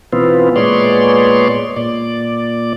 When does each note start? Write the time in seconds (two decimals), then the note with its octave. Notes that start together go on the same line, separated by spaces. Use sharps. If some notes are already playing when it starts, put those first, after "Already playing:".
0.13 B2 E3 B3 C4 F4
0.56 A#2 G#3 B3 C#5 D5 C6
1.76 A#2 D5